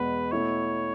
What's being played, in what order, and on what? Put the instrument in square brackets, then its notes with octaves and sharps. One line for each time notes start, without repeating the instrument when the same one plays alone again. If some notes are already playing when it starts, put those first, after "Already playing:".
Already playing: [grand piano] E2 B2 G#3 [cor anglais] B4
[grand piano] B2 A3 E4 [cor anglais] C#5